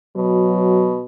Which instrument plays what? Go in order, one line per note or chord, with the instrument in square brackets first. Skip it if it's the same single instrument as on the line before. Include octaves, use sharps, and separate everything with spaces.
[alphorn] B2 [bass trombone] F#3